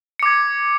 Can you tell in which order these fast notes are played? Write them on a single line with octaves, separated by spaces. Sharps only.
C#7 D6 G#6